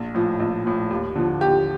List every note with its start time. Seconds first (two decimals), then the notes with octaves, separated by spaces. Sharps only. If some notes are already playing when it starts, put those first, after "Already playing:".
Already playing: A#1
0.15 A2 F3
0.40 A#1
0.65 A2 F3
0.91 D#2
1.15 D3 F3
1.41 D#2 G4